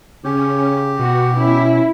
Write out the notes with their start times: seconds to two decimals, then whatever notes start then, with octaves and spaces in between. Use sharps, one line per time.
0.24 C#3 C#4 G4
0.99 B2 F#4
1.38 C#4 E4